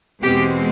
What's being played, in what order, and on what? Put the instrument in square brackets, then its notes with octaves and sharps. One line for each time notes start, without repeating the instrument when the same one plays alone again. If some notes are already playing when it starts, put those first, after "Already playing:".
[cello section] E2 B2 G#3 C4 G4